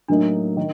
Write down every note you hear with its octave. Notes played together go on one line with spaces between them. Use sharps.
A2 F#3 A#3 D4 D#4
D#3